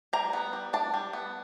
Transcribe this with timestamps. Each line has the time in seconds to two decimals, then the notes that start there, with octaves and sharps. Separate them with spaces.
0.13 G3 A#5
0.33 B3
0.53 G3
0.73 D4 A5
0.94 G3
1.13 B3